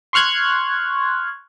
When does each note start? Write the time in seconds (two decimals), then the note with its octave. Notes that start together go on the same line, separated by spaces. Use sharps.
0.13 C6 C#6 F6 F#6 G#6